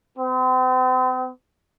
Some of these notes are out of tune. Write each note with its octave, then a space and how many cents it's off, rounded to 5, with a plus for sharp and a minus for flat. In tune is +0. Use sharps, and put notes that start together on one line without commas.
C4 -40